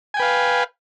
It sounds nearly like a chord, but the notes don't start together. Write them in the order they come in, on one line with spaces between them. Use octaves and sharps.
G#5 G5 B4 F5